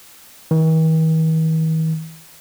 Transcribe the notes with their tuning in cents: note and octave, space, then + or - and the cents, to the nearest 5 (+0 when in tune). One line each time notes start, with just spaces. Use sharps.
D#3 +45